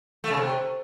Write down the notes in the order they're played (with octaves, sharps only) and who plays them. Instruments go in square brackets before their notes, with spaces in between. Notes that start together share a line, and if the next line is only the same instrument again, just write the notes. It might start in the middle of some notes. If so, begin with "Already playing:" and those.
[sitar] A3
C#3
C3